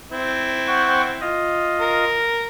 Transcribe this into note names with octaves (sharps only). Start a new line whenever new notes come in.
C4 E4
F#5 G5 C#6
F4 D#5
A#4